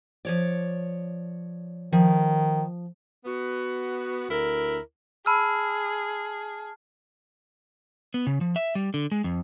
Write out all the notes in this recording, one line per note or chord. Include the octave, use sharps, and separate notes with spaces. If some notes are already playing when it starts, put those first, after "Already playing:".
F3 C#5 D5
D#3 F3
B3 F#4
D2 E4 A#4
G#4 A5 B5 E6 F6
B3
C#3
F3
E5
G3
D3
G#3
F2